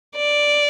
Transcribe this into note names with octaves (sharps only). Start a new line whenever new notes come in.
D5